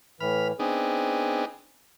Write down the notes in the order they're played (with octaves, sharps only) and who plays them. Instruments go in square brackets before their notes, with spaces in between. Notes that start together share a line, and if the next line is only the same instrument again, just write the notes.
[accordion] A2 E3 [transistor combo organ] B5 F6
[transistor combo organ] B3 D4 D#4 [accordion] C4 G#4